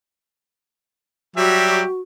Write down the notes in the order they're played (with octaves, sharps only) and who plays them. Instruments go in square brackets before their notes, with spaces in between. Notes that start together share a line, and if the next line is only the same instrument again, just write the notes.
[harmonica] F#3 G3 E5 [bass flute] F#4 [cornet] G4